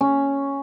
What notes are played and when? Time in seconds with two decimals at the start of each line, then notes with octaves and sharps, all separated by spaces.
0.01 C#4